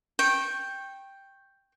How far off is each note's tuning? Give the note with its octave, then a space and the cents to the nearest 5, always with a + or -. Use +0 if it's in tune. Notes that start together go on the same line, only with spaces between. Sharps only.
G5 +0 C#6 -25